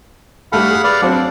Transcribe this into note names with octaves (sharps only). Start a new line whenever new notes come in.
G3 A3 A4 F5 F#5 B5
G#4
B4 D5 F5
F#3 C4 D4